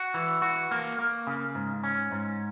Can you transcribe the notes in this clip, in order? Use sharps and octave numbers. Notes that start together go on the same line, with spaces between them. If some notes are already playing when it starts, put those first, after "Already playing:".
Already playing: F#4
E3
F#4
A#3
A#3
C#3
G#2
C#4
G#2